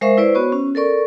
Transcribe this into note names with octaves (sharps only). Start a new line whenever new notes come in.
G#3 A#4 C5 E5 F5 C#6
E4 B4 C5 D5
B3 F#4 C#5 C#6
C#4
A4 A#4 D5 C#6